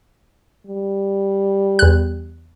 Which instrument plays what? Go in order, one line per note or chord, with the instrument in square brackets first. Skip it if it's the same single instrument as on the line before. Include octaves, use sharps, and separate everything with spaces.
[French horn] G3
[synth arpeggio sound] E2 F#6